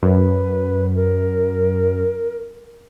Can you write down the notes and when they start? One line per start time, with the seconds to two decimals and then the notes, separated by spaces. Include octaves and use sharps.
0.03 F#2 B4
0.95 A#4